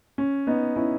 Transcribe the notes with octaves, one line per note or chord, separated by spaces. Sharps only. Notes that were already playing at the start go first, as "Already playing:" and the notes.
C#4
B3 D#4
C#4 E4